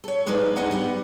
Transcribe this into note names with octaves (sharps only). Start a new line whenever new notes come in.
A4 C#5
F3 G#3 A#3 D#4 B4 D5
D2 G#3 D#4 G#4 F#5 A5
G3 B3 F#5